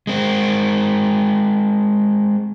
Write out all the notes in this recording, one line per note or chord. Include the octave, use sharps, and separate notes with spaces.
G#3 C4